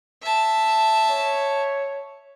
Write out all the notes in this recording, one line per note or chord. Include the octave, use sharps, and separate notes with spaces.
E5 A5
C#5